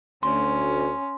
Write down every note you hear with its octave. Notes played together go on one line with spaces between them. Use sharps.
D2 C#4 C6